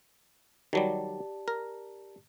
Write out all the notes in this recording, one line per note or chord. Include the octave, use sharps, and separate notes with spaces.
D#3 F#3 G3 G4 D5 A5
A#4